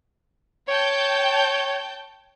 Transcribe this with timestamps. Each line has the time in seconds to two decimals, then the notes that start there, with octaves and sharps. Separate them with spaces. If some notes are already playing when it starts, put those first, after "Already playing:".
0.68 C#5 G5 A5 G6